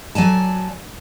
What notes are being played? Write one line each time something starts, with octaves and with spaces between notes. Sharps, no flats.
F#3 D5 G#5 A5